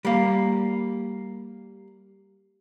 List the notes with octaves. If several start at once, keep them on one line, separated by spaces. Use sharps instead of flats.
G3 A#3